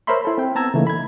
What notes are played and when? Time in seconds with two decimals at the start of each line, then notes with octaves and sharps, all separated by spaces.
0.07 A#4 C5 C#5 E5 B5 C6
0.25 E4 A4
0.38 C4 G5
0.55 B3 A5 A#5 E6 G#6
0.74 C#3 E3 A3 A#3 D#4
0.87 B5 G#6